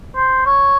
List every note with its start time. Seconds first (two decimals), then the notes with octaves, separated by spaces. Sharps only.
0.16 C5
0.46 C#5